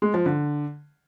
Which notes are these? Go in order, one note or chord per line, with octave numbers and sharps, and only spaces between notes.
G#3
F3
D3